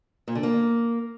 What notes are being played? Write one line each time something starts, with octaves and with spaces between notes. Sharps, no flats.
A#2
D3
A#3